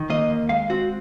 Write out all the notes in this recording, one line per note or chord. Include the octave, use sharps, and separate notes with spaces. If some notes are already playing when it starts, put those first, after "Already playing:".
Already playing: D#3
A#3 D#5
D#2
G#3 F5
C4 F#4